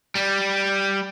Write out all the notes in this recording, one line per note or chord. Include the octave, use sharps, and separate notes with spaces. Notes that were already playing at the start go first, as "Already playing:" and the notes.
G3